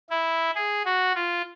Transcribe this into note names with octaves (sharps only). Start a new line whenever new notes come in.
E4
G#4
F#4
F4